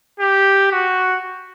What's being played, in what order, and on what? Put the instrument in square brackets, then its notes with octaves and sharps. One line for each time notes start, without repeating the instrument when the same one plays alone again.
[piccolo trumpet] G4
F#4